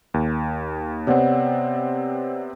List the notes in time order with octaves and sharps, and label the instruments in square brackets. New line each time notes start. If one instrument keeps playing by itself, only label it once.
[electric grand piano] D#2
[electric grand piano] C3 B3 C4 [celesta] C#5 D5 F#5